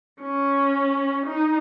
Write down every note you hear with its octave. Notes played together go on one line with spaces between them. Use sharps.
C#4
D#4